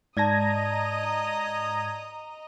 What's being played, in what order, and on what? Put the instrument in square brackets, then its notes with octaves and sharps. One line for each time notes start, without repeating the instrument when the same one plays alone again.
[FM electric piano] G#2 G#6 A#6 [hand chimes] D5 A5 [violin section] D#5 A#5 D#6